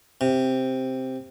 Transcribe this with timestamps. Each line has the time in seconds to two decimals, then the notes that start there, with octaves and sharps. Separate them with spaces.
0.21 C3